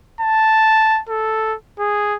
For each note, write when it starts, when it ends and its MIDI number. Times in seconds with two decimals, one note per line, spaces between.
0.21 1.00 81
1.09 1.55 69
1.79 2.16 68